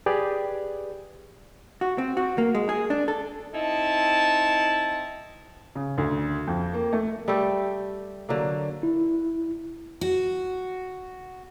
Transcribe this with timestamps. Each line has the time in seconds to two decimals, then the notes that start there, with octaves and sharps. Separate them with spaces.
0.06 G4 G#4 B4 D5
1.81 F#4
1.98 C4
2.17 F#4
2.38 A#3
2.55 G#3
2.69 G#4
2.90 D4
3.08 A4
3.53 C4 D#4 E4 A5
5.75 C#3
5.98 D2
6.47 F2
6.74 A#3
6.93 A3
7.28 G3 A3 G4 A4
8.29 D3 F#3 A#3
8.83 E4
10.01 F#4